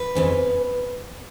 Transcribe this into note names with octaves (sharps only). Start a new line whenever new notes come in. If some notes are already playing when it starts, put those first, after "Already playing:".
Already playing: B4
F2 C#3 E3